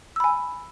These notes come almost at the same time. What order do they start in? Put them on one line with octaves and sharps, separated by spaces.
E6 B5 G#5